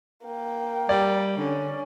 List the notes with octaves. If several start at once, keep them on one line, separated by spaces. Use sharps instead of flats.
A#3 G5
G3 D5
D3 C#4